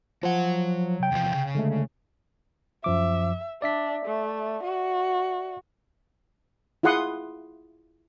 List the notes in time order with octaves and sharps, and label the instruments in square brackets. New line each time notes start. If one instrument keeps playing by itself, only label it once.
[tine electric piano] F3 [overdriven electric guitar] F#3 F#5
[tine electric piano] C3 G5
[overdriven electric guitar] E2 F3
C#3
[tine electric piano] D3 G#3 A3
[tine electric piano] F#2 F3 D6 [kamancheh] E5
[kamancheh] D4 [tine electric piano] D5 E5 B6
[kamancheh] A3
F#4
[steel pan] E4 F4 G#4 F#5 C6 D#6